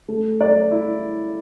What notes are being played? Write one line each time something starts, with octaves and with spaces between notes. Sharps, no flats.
A3
D5
E4